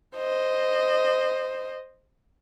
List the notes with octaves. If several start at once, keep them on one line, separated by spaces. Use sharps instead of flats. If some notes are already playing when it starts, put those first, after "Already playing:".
C5 D#5